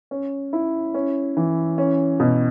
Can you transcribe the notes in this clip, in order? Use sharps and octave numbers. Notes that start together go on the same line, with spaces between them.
C#4
E4
C#4
E3
C#4
B2